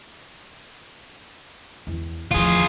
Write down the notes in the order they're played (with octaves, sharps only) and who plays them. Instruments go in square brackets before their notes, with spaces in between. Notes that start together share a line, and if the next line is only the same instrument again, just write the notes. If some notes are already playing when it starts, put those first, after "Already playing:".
[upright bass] E2
[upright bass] E2 F3 [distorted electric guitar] F4 G#4